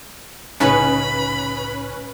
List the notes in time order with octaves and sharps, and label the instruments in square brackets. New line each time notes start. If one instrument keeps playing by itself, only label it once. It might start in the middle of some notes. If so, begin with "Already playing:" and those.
[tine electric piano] C2 A2 [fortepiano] C#3 D#4 [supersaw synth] C#4 B4 [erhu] B5